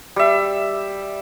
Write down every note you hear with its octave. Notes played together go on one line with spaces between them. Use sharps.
G3 E5